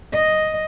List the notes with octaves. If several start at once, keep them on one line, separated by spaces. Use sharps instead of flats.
D#5